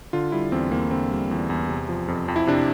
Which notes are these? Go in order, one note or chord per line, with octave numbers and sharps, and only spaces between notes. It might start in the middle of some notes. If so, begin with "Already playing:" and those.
D3 F4
G3 E4
E2 C4
E2 A#3
D3 C4
G3
E2
E2
C3
F3
F2
F2
E4
C3 D4